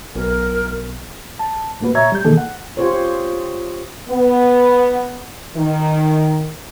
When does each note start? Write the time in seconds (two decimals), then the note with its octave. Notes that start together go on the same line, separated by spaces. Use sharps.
0.15 B1 A#4
1.39 A5
1.80 C#2 A2 A#3 F#4 B4
1.95 A#2 C#5 E5 A#5 C#6 G#6
2.12 G3 G6
2.25 B2 D#3 E3 A#3 G#4 A4
2.37 F#5
2.77 F4 G4 G#4 C5 C#5
4.09 B3
5.56 D#3